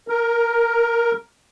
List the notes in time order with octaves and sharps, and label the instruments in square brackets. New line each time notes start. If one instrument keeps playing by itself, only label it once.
[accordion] A#4